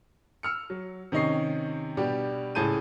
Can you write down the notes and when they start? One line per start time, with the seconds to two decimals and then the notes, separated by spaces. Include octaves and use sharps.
0.43 E6 F6 C#7
0.70 F#3
1.12 C3 D#3 C#4 D#5 C#6 C7
1.97 B2 G3 D4 G4
2.55 C#2 A2 G#4 A5 G6 D#7